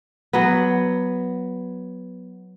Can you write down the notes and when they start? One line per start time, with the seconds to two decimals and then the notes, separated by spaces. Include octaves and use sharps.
0.33 F#3 B3